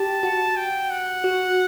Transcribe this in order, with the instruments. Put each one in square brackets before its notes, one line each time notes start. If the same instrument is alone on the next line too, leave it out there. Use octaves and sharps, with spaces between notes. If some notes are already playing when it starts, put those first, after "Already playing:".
Already playing: [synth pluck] G4 [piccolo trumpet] A5
[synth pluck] F#4
[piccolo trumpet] G5
F#5
[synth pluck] F#4